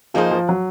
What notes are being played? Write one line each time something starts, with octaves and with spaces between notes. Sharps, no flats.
F3 A#3 D#4 G#4 C5
F3
F#3